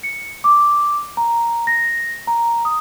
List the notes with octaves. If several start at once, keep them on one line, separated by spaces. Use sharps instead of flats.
C#7
D6
A#5
A#6
A#5
D#6